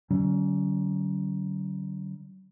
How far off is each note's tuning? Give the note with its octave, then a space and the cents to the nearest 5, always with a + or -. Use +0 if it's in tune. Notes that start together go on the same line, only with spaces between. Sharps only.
D3 +0 F#3 +35 C#4 +25